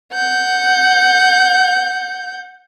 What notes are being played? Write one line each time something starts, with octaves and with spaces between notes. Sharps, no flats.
F#5 G6